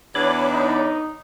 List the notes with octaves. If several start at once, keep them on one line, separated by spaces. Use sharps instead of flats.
E2 B3 D4 C#5 B5 D6
D#4